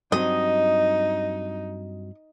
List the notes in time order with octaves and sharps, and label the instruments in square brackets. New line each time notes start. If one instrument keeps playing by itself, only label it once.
[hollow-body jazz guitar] G2 F#3 C4 [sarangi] D#4 [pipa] D#5